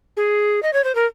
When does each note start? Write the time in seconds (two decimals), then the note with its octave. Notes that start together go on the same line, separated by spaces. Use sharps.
0.17 G#4
0.63 D#5
0.73 C#5
0.84 C5
0.95 A#4